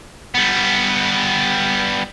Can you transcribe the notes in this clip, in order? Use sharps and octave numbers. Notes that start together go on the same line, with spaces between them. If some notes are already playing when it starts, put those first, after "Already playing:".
G3 B3